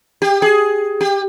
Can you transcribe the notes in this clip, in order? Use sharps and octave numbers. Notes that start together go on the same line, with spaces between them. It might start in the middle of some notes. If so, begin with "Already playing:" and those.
G4
G#4
G4